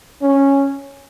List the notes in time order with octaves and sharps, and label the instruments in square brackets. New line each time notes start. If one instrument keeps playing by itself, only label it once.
[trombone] C#4